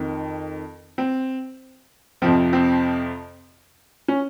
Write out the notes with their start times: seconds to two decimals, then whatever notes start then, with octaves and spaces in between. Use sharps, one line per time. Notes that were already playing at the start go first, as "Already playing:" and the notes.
Already playing: F2 D#3
0.98 C4
2.22 F2 C3 F3 C4
2.53 C4
4.08 C#4